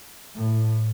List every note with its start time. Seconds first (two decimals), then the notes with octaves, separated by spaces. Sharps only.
0.36 A2